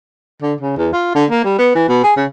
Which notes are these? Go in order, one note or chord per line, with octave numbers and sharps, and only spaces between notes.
D3
C#3
E2
F4
D3
A#3
G3
B3
E3
B2
G#4
C#3